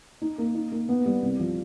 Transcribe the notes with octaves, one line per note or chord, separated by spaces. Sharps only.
D#4
A#3
D#4
A#3
B3
G3
C2
F3